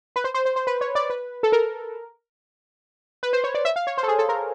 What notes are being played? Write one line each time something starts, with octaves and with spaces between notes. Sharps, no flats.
B4
C5
C5
C5
C5
B4
C#5
D5
B4
A4
A#4
B4
C5
C#5
D5
E5
F5
C#5
C5
A4
G#4
A4
A#4